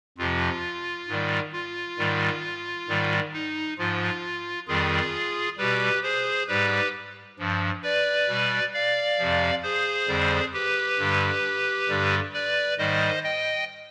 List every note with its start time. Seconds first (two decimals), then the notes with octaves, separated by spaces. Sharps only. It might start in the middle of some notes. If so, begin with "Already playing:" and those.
0.18 F2 C3 F3 F4
1.08 G#2 D#3 G3
1.52 F4
1.98 G#2 D#3 G3
2.88 G#2 D#3 G3
3.33 D#4
3.78 G#2 F3 F4
4.67 F2 D#3 G3 F4 G#4
5.58 B2 G3 G4 B4
6.03 G#4 C5
6.48 G#2 G3 G4 B4
7.39 G2 F3
7.83 B4 D5
8.28 B2 G3
8.73 D5 F5
9.19 F2 C3 F3
9.63 G#4 C5
10.08 F2 D3 G3
10.53 G4 B4
10.98 G2 D3 G3
11.89 G2 D3 G3
12.33 B4 D5
12.78 G#2 D#3 G3 C5 D#5
13.23 D#5 G5